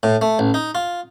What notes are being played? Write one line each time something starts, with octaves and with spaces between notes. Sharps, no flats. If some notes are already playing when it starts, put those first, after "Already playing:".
A2
A3
A1
D#4
F4